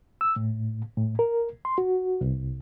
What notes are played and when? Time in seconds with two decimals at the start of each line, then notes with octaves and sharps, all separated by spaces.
0.21 E6
0.36 A2
0.97 A2
1.19 A#4
1.65 C6
1.78 F#4
2.21 C2